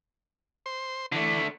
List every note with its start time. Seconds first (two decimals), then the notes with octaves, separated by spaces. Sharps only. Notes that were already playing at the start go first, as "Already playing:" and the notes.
0.66 C5 C6
1.12 D3 E3 A3 D4